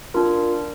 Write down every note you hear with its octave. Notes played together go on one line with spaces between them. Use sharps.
D4 F4 A#4